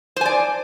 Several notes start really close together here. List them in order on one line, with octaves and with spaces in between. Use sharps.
C5 G#5 D5